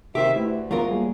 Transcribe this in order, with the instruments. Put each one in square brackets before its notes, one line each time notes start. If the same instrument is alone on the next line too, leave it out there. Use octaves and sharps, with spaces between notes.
[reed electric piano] C3 [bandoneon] D#3 E5 [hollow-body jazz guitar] G4 C5
[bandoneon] D2 [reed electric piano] A3 E4 B4
[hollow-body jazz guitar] F#3 F4 A#4 [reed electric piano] G#3 B3
[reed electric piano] G3 A#3 G#4